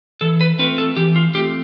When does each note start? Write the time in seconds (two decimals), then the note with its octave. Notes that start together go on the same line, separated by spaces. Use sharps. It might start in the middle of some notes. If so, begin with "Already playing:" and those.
0.21 E3 A4
0.41 B4
0.59 A3 C4 F4 B4
0.78 A4
0.97 E3 G4
1.16 F4
1.34 A3 C4 F4 G4